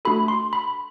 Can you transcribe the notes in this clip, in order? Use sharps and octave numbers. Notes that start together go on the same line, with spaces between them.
A3 D4 F#4 A4 B5
C6
B5